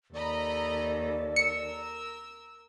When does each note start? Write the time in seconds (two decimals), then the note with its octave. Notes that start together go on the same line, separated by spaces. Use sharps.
0.14 D#2 A4 D5 D#5 A#5 B5
1.36 A#4 E6 C#7